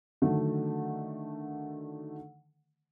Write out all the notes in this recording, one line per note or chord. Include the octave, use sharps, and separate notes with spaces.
D3 D#3 F#3 A3